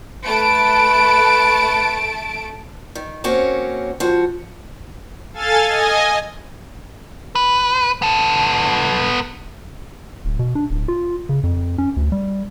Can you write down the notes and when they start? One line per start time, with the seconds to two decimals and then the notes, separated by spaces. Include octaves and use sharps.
0.25 A3 B4 A5 D7
2.95 D#3
3.24 A#3 C4 C#4 F#4 C#5
4.00 F3 F#4
5.33 A4 F5 G#5 A6
5.67 D#5 G#5
7.35 B4
8.02 B3 A4
10.25 D1
10.39 B2
10.55 D4
10.70 D1
10.88 F4
11.29 C#3
11.44 F2
11.78 C#4
11.97 D2
12.12 G3